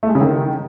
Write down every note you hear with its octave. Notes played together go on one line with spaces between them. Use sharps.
A3
G#3
C#3
D#3